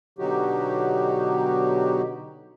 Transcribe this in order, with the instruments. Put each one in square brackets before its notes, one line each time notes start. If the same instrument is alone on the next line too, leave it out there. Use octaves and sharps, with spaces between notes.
[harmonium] B2 D3 F#3 D#4 F#4 G4